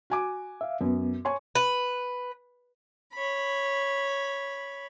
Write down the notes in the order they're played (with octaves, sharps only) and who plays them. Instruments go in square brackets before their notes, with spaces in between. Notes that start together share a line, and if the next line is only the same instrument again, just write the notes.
[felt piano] F#4 G#5 D6
[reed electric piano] E5 F5
[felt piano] F#2 [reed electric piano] B3
[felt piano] C#5 G#5 C#6 [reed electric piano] C6
[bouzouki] B4
[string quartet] C#5 B5